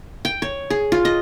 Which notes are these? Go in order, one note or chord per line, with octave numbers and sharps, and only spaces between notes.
G5
C#5
G#4
F4
D#5